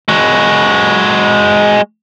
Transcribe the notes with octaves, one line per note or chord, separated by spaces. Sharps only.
G#3 F#4